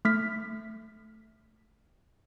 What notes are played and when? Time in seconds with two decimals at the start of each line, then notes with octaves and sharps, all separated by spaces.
0.05 A3 F6 B6